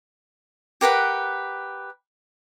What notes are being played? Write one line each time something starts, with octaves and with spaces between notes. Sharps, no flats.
G4 A#4 B4 F#5